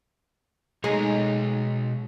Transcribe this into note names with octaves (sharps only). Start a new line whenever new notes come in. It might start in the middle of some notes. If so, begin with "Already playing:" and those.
B2 G#3 D#4 C#5 A#5